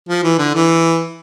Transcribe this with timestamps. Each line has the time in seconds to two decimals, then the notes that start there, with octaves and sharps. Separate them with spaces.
0.09 F3
0.24 E3
0.39 D3
0.54 E3